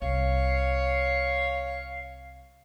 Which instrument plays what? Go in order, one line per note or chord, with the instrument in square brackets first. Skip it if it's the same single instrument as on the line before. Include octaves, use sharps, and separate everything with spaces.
[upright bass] C2 [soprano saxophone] C#5 [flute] F5